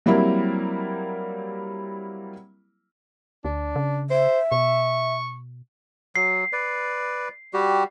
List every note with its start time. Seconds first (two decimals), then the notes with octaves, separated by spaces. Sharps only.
0.06 F#3 G3 A#3 C4 E4 A#4
3.45 D2 D4
3.76 C#3
4.10 C5 E5
4.52 B2 C#6
6.16 F#3 C7
6.53 B4 D5
7.53 G3 F#4 G4